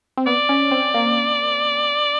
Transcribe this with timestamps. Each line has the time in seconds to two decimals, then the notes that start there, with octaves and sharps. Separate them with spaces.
0.17 C4
0.27 B3 D5
0.49 C#4
0.71 C4
0.94 A#3